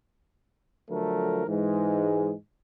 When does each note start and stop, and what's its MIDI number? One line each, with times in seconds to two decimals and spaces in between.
0.90 1.43 50
0.90 1.43 53
0.90 1.43 54
0.90 1.43 57
0.90 1.43 69
0.90 1.43 70
1.48 2.33 44
1.48 2.33 52
1.48 2.33 56